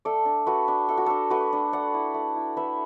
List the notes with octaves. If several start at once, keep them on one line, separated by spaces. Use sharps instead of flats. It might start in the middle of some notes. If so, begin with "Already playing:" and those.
A3 A4 D5
D4
A3 F#4 B4
D4
A3 A4
F#4
D4 A4
A3 F#4 B4
D4
A3 D5 F#5
E4
A3
E4
A3 B4 E5